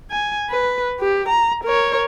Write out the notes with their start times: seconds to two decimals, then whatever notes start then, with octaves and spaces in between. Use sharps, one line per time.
0.10 G#5
0.50 B4
1.00 G4
1.29 A#5
1.64 A#4 C#5